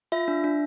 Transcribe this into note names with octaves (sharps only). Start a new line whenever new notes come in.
F4 E5
D4
D4